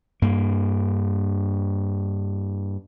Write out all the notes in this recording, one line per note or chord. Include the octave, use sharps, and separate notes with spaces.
G2 A#3